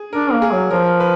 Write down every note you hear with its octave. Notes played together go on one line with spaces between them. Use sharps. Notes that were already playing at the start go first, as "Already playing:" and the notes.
Already playing: G#4
D4 A#4
A#3
G#4
F#3
F3 A#4
B4